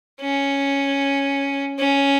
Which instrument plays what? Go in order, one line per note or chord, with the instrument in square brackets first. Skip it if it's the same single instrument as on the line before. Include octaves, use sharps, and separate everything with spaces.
[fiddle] C#4
C#4